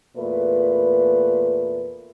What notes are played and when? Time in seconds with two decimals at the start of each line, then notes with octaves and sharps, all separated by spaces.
0.17 E2 A#2 A3 B4